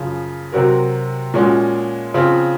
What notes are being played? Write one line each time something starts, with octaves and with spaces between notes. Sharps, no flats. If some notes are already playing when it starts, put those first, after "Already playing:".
Already playing: F#2 C#3 F3
C3 F#3 C4 F#4 A#4
A#2 F3 G#3 C#4 F#4
C#3 F3 C4 F4